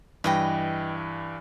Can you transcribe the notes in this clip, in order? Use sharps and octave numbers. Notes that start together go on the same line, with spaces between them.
G2 E3 B4 D#5 G5